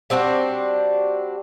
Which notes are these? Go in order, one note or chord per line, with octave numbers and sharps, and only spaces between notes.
G3 C4 D4 F#4